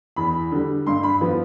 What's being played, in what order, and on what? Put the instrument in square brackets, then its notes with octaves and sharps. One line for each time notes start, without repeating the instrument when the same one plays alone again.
[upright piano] E2 B5
D3 G3
G2 C6
B5
F3 B3